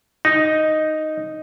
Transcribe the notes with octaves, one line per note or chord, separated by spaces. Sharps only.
D#4